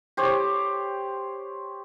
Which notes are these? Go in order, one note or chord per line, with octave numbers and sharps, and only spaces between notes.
G4 C5 C#5